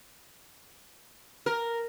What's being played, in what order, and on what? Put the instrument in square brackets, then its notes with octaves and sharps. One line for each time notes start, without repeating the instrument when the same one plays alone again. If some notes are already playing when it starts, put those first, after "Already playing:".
[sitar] A#4